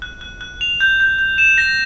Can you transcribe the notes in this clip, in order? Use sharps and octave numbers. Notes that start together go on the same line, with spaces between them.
F#6
F#6
F#6
F7
G6
G6
G6
E7
A#6